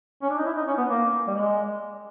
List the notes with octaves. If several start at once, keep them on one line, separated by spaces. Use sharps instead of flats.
C#4
D4
D#4
E4
D#4
C#4
B3
A#3
G3
G#3